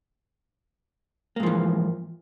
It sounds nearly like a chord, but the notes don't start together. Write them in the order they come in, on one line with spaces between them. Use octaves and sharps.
A#3 G#2 F3 E3